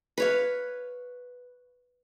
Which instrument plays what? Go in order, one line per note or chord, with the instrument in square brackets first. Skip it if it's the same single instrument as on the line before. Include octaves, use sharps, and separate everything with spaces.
[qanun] B4 C#5 F5